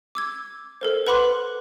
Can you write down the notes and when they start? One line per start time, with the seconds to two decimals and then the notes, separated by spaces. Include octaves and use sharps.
0.15 D6 E6 G#6
0.81 A4 A#4 C5
1.07 B4 F#5 B5 C6 D6 F#6